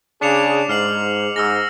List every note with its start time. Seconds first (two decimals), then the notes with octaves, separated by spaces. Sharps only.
0.22 C#3 D4 G#4 D6 C#7 F7
0.69 G#2 F6 C7 F#7
1.36 G#2 E6 F6 A#6